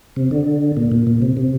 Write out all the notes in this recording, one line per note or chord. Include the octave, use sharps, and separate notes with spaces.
C3
D3
A#2
A#2
A#2
C3
C3